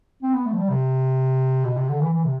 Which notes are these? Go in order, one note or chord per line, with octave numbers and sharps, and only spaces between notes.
C4
B3
A3
F3
G3
C3
B2
C3
D3
E3
E3
C3